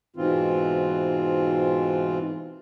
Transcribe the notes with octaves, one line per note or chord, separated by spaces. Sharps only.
G#2 B2 E3 C4 F4